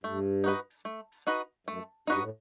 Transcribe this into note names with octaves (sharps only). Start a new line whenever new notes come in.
G2 A3
D#4 F#4 B4 D#5
A3
D#4 F#4 B4 D#5
F#2 A3
G2 D#4 F#4 B4 D#5
A2